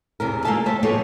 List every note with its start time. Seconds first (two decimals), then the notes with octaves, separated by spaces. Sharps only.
0.20 E2 C3 A#4
0.45 G#3 A#3 F4 A4 E5 A5
0.66 A3 G4 C5 E5
0.83 F3 G#3 A#3 B3 A4 C#5